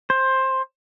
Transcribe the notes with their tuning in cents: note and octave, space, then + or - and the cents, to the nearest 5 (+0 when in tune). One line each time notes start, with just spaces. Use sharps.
C5 +15